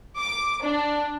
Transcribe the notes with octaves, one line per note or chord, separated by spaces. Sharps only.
D6
D4